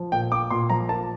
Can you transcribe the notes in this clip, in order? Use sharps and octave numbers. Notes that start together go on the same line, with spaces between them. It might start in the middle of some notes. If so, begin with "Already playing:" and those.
Already playing: F3
A#2 G5
A#3 D6
A#2 C6
F3 A#5
A#3 A5